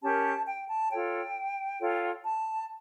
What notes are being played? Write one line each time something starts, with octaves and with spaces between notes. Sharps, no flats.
C#4 G4 A#4 A5
G5
A5
F4 A4 C#5 G5
F4 A4 C#5
A5